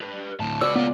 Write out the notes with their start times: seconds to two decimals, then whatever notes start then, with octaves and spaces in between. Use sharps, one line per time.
0.01 G4 B4
0.40 D2 A2 A5
0.61 C#2 F#4 B4 D5 E6
0.76 A#3 B3 F4